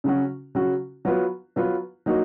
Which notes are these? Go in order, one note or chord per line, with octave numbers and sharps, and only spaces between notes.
C#3 F#3 C#4 F#4
C#3 F#3 C#4 F#4
F#3 B3 F4 B4
F#3 B3 F4 B4
F#3 A#3 D#4 F#4